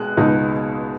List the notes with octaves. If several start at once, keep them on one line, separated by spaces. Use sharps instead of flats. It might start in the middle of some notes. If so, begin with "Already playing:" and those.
Already playing: B2 G#3 F#6
C#2 B2 G#3 D#4